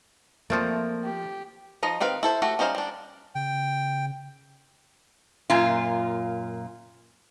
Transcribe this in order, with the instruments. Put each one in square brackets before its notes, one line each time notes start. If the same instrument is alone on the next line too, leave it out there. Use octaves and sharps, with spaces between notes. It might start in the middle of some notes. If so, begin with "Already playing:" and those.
[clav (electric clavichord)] F3 D5 [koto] A3 C4 A4 [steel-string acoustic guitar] A#3
[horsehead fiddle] G4
[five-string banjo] F3 D#4 D#5
D#3 C4 B4 F5
E4 A4 C5
A3 F#4 G4
G3 C#4 D#4 C5 F5
G3 D4
[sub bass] C#3 [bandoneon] G5
[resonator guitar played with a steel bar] F#2 A#2 F4